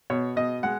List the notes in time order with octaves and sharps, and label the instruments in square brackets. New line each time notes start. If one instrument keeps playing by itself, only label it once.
[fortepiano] B2 C#5
B2 D#5
G#3 F#5